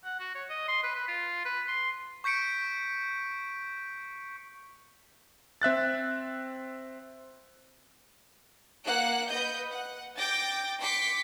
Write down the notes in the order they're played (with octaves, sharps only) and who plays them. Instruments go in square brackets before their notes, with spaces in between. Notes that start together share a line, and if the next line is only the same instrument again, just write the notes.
[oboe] F#5
F#4
C#5
D#5
C6
B4
B4
F4
B4
C6
[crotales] C#6 G6 B6 C#7 D7
[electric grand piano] C4 E5 F#6 A6
[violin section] A#3 F#5 F#6
B4 D#5 G6
F#5
G5 D6 G6 A6 A#6
C6 D6 B6 C#7